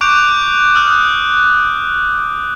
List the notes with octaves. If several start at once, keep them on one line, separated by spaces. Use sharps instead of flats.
C#6 D6 F#6 G6 D7 F7
D#6 F6 F#6